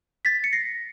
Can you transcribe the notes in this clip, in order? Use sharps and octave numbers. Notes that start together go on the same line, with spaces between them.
A6 B6
C#7
A#6 C7